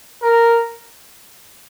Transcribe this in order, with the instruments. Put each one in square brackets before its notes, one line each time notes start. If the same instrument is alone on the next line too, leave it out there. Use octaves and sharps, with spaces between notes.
[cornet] A#4